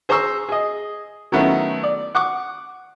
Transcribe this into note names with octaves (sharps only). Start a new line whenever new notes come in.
G#4 C5 A#5 C6 C#6 E6
G#4 D#5
D#3 F#3 A3 B3 C#4 E4
D5
F#5 C#6 D6